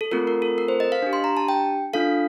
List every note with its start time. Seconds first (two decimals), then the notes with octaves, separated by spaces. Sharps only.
0.01 A4
0.11 A3 C4 F4 A4 A#4
0.27 A#4
0.42 A4
0.58 A#4
0.68 C5
0.80 D#5
0.92 F5
1.02 D4 G4
1.13 C6
1.24 A#5
1.37 A5
1.48 G5
1.93 D4 F4 A4 F5